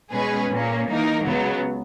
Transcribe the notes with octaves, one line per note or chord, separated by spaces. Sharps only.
B2 G#3 C#4 G#4 B4
A#2 A#3 C#4
E3 A#3 D#4 A#4
C#2 C#3 F#3 B3